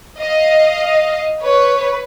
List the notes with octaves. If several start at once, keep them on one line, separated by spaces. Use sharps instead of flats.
D#5 F5
B4 C#5